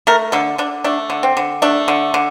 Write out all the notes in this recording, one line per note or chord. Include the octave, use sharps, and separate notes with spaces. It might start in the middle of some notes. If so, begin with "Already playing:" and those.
A3 A#4
D3 A4
D3 D4
A3 D4
D3
C4
D3
A3 D4
D3
D3